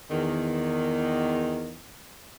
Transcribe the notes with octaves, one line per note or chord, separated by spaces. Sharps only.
E2 D#3